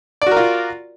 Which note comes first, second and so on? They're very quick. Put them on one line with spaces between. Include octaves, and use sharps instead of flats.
D5 F#4 A#4 F4